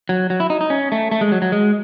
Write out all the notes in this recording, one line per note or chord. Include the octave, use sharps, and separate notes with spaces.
F#3
F#3
E4
D#4
D#4
C#4
A3
A3
G#3
F#3
F#3
G#3